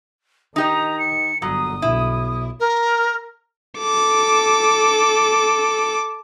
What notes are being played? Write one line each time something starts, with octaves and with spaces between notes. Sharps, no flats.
D#3 D#4 G4 D#5 A#5
C#7
G1 F#3 D#6
B1 E4
A#4
A4 D6